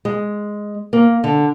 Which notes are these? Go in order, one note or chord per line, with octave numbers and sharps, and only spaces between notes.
G#3
A#3
D3